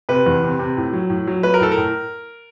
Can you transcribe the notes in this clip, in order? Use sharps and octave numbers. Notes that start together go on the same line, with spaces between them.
C3 B4
E2
C3
C3
A2
F#3
A2
F#3
F#3 B4
A#4
A2 A4
A#4
A2